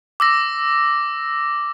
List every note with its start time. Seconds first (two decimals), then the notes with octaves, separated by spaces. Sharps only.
0.20 D6 E6 A#6